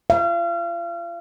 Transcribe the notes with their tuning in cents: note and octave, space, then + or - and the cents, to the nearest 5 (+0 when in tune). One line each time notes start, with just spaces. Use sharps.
F5 -35